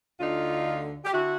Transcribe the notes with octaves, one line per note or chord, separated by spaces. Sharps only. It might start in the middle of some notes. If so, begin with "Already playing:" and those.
D2 D3 D#4 F4
G4
D3 E4 F#4